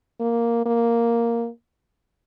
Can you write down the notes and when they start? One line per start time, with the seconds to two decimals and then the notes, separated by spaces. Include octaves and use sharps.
0.20 A#3
0.66 A#3